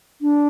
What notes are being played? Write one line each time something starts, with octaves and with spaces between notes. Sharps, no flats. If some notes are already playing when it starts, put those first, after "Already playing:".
D4